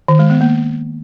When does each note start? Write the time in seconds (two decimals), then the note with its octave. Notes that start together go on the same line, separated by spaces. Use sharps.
0.08 D#3
0.19 G#3
0.30 B3
0.41 A#3